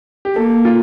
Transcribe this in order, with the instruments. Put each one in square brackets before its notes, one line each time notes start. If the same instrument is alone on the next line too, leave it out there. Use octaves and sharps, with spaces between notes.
[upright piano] G4
[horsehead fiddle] A#3 [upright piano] A4
[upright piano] F4